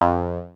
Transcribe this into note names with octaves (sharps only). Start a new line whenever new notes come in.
F2